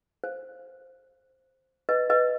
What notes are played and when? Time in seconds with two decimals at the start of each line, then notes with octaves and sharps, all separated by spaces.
0.24 C5
1.89 B4 D#5
2.10 B4 D#5